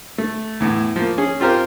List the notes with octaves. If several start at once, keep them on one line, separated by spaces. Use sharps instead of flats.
A3
E2 A2
F3 A#3
C#4 G#4
C4 F4 G4 A#4 C5